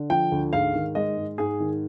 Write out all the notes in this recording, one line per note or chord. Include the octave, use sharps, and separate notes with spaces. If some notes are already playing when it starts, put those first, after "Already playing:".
Already playing: D3
F3 G5
D2
G#2 F5
D#3
G#3 D#5
G#2
G#2 G#4
D#3